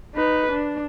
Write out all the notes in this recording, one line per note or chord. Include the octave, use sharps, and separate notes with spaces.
D#4 B4
D4